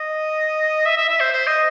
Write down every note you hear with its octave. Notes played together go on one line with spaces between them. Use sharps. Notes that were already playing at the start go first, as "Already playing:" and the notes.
Already playing: D#5
E5
E5
E5
C5
C5
D#5